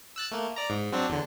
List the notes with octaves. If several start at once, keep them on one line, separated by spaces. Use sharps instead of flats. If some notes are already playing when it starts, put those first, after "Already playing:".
E6 F#6 A6
A3 A#3
D5 A#5
G#2
F#3 C4 D4
E2 D3